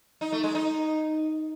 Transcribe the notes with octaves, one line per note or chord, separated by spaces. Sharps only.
D#4
A3
G#3
D#4